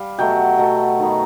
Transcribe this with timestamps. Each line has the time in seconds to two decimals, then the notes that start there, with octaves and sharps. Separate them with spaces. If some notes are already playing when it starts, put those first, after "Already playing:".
Already playing: G3 F5
0.18 B2 F#3 A3 G5
0.58 B2 F#3 A3
0.99 D#3 F#3 B3